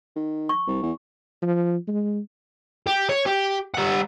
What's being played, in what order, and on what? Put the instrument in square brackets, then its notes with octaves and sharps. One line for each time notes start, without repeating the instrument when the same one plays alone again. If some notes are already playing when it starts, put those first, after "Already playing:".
[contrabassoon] D#3
[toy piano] C#6
[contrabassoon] C2
E2
[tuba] F3
G#3
[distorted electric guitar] G4
C#5
G4
G3 F#5